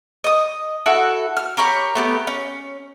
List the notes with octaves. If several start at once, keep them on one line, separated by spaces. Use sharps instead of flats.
D#5 D#6
E4 F#4 A4 F#5
F6
G4 A#4 C#5 B5
A3 B3 G4
C#4